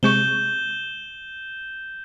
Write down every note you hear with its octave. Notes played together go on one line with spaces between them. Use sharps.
C3 G#3 C#6 G6 E7 G7